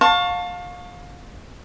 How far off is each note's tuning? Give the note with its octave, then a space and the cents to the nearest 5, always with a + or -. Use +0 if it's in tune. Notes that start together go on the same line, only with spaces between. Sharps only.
F5 +30 A5 +15 C#6 +0